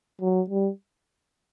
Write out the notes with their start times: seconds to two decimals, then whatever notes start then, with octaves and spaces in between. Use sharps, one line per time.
0.21 F#3
0.50 G3